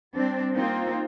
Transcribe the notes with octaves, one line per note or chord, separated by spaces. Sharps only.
G3 C4 D4
A#3 C4 D#4 F4